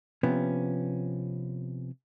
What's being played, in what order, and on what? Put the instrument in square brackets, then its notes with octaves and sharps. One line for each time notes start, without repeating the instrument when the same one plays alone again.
[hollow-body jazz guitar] C3 F3 B3 C#4